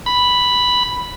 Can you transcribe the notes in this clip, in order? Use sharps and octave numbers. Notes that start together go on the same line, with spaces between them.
B5